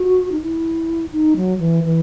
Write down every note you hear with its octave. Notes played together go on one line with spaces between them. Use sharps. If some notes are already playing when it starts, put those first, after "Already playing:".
Already playing: F#4
D#4
E4
D#4
F#3
E3
E3